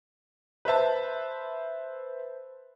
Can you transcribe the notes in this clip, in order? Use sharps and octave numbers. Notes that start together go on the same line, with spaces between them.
B4 C5 E5 A5